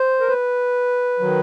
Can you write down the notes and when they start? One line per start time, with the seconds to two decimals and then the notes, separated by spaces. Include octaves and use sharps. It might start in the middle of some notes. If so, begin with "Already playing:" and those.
Already playing: C5
0.20 A#4
0.28 B4
1.20 D#3 F#3